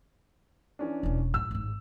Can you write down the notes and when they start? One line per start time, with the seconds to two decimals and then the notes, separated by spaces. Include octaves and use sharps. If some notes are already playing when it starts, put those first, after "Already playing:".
0.79 E3 C#4 D4
1.03 E1 B2
1.34 A1 G#2 E6
1.51 G#1 A2